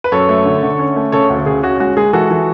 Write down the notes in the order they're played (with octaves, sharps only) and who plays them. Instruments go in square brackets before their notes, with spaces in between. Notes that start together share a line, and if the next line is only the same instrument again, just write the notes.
[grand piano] B4
F#2 A4 C#5
A3
D3
D3
C#4
A3
C#3 A4 C#5
D2
C#3 G#4
C#4 F#4
G#3 F#4
G#3 G#4
E3 F#4 A4
E3